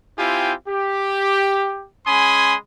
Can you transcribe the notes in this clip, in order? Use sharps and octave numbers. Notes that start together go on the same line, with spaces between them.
C4 E4 F4 G4 G5 G#5
G4
G#3 C#4 G#5 B5 C6 D#6